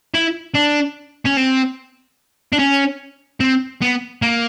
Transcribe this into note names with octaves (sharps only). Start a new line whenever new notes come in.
E4
D4
C#4
C4
D4
C#4
C4
B3
A#3